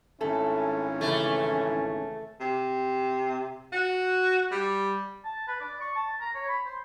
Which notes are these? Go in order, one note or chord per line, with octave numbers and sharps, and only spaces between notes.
G#1 A3 C#4 E4 A4
C#3 E3 A3
C3
F#4
G3
A5
B4
D5
C#6
A5
A#5
C#5
B5
C5